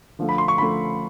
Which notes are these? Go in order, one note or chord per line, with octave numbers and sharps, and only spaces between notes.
D3 F3 A3
B5
C6
C#6
D3 F3 A3 B5